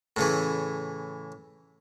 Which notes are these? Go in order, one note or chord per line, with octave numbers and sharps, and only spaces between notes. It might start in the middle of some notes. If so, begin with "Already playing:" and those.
A2 C#3 E3